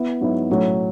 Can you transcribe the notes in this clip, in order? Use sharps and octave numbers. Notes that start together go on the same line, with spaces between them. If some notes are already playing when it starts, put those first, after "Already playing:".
Already playing: B3 E4
G#2 F#3 B3 E4
B1 A2 F#3 A3 C#4